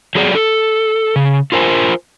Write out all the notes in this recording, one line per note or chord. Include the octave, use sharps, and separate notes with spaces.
F#3 G#4 D5
A4
C#3
F4 A#4 C5 G#5